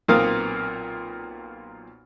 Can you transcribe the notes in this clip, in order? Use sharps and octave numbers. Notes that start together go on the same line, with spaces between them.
B1 A#2 A#3 C4 F5 D#6